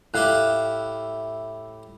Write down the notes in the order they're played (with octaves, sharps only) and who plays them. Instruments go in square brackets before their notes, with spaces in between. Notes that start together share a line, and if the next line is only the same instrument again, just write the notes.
[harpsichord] A2 E4 G4 [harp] F5 F#6